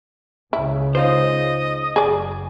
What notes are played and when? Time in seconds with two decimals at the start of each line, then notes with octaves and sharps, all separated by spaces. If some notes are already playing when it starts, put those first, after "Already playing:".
0.53 C#2 C#3 E4
0.95 D#4 F4 C5 D#5
1.96 F#1 G#4 D5 G#5